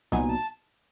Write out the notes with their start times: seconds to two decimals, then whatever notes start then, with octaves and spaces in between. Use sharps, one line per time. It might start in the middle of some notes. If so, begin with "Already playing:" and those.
0.12 C2 A#2 F#3 B3 D#4 G#5
0.29 A5